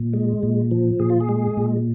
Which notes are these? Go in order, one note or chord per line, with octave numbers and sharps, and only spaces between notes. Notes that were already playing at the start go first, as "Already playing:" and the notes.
Already playing: A#2
G#3
A#2
F3
A#2 G#4
F4
G#4
G#3
A#2